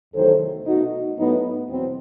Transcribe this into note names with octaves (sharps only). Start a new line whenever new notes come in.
E2 C3 D#3 F#3 A3 A4 C5
B2 A3 D#4 F#4
A2 F#3 A3 B3 D#4
E2 B2 F#3 C4